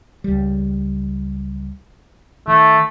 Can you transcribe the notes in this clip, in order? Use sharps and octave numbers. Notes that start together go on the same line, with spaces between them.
C#2 G3
D#3 A3